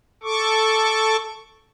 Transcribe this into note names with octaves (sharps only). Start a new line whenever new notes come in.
A4 C#6 D6